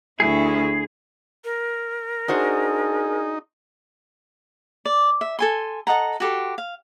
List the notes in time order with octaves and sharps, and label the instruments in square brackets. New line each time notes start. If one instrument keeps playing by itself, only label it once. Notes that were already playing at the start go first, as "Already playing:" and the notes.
[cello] D2 E4 [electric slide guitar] G#4
[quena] A#4
[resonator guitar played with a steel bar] D4 F#4 C5 [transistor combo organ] D#4 [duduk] G#4
[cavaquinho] D5
E5
A4 G#5 C6
A4 D#5 F#5 A#5
F#4 G4 A4 C6
F5